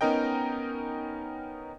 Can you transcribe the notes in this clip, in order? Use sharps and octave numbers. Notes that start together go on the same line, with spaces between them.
B3 C#4 D#4 A#4 D#5 G5